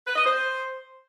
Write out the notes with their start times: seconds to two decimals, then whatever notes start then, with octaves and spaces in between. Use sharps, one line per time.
0.06 B4
0.15 D#5
0.25 C5